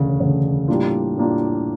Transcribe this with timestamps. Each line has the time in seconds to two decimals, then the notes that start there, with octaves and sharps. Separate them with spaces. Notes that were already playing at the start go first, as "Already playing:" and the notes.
Already playing: E1 D2 C#3
0.20 E1 D2 C#3
0.68 A2 G3 A#3 D4 F4
1.17 A2 G3 A#3 D4 F4